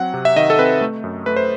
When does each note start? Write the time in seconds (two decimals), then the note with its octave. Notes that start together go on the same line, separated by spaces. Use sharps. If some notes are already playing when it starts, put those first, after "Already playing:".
Already playing: F#3 C4 F#5
0.14 C3
0.25 E5
0.36 D#3 D#5
0.50 A4
0.59 C4 B4
0.81 A3
1.04 F#2
1.26 A3 B4
1.36 C5